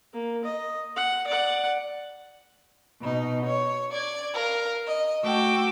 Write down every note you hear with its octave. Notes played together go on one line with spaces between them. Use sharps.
A#3
D#5
F#5
D5 F#5
B2 D#4
C#5
D5 G#6
A#4 F5
D#5
A3 F#4 G5 D6 E6